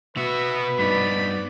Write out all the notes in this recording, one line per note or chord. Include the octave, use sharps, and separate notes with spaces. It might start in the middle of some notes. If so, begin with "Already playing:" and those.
B2 F#4 B4 E5
G2 B3 D#4 D5 B5